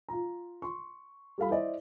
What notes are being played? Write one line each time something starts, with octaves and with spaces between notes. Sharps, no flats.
F4 A#5
C6 C#6
G3 A4 F5 B5
E4 C5 D5 D#5